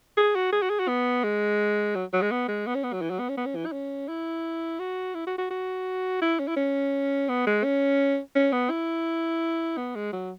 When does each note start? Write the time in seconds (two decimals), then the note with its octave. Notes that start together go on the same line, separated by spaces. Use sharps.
0.17 G#4
0.35 F#4
0.52 G#4
0.62 F#4
0.70 G#4
0.79 F#4
0.88 B3
1.24 G#3
1.95 F#3
2.13 F#3
2.22 G#3
2.31 B3
2.48 G#3
2.67 B3
2.75 C#4
2.84 B3
2.93 F#3
3.01 E3
3.10 F#3
3.19 B3
3.29 C#4
3.37 B3
3.46 C#4
3.55 E3
3.66 E4
3.72 C#4
4.09 E4
4.79 F#4
5.15 E4
5.27 F#4
5.38 F#4
5.51 F#4
6.22 E4
6.39 C#4
6.48 E4
6.56 C#4
7.29 B3
7.47 G#3
7.64 C#4
8.35 C#4
8.52 B3
8.70 E4
9.77 B3
9.96 G#3
10.13 F#3